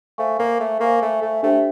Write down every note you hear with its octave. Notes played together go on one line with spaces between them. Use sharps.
A3 C5 F5 G#5 C#6
A#3
A3
A#3 C5 F5 G#5 C#6
A3
A3
A3 D4 G4 C5 E5 G5